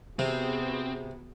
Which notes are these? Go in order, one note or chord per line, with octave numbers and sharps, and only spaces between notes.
C3 B3 C4 F#4 G#4